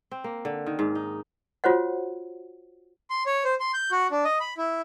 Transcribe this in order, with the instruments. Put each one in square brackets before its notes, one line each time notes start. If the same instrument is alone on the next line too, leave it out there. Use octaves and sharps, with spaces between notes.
[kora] C4
A#3
D3
D#3
G#2
D#4
[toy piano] F4 F#4 C5 C#5 F#5
[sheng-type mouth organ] C6
C#5
C5
C6
G6
F#4
D4
D#5
B5
E4